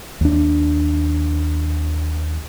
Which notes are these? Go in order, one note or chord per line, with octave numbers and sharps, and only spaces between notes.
D#2 D4